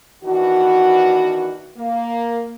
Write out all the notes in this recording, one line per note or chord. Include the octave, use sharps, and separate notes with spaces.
D#3 E3 B3 D4 F#4
A#3